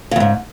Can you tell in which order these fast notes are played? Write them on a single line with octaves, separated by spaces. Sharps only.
C#3 E2 G#2